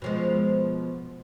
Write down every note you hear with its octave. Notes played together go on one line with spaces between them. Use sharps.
B2 F3 G#3